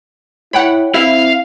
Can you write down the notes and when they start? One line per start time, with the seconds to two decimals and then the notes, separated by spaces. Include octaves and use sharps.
0.53 E4 C#5 F#5 G5 B5
0.94 C4 E4 E5 F5